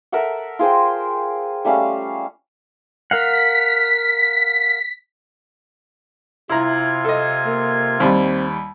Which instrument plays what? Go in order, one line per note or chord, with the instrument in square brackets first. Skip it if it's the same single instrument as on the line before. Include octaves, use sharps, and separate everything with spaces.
[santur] A4 A#4 E5 F#5
F4 G#4 C5 G5
G3 A3 C#4 F5
[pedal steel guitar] A#4 F5 F#5 [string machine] B6
[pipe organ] C3 F4 G#6 [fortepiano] E4 A#5
[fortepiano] A4 D#5
[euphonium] A#3
[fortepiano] D#2 G3 [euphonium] C4